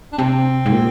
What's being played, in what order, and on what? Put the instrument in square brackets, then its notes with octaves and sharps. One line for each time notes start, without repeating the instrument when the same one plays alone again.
[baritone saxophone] D4
[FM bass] C3 [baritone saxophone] C4
[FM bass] G#2
A#2